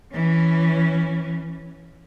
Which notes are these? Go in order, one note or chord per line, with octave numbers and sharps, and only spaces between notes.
E3 C#4